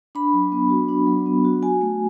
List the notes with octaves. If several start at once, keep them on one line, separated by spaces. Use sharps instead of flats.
D4 B5
F#3
B3
F#4
D4
F#3
B3
F#4
F#4 G#5
A3